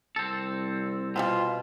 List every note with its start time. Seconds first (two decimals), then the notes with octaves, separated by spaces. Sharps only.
0.16 C2 C4 A4
1.16 B2 G3 A#3 C4 F4